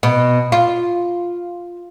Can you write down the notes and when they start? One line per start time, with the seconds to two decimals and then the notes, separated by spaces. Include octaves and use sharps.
0.03 B2
0.52 F4